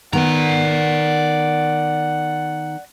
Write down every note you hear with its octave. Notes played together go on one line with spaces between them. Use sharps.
D#3 B3 D5 F#5 A#5